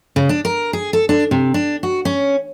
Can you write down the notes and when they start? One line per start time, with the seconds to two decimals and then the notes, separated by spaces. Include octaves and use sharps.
0.16 C#3
0.29 D4
0.45 A#4
0.73 G#4
0.93 A4
1.09 D4
1.31 C3
1.54 D4
1.83 F#4
2.05 C#4